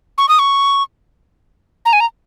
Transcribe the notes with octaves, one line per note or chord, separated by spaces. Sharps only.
C#6
D#6
C#6
A#5
G#5
A#5